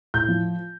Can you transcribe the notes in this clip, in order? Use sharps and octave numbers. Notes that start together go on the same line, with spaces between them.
A2 G6
F3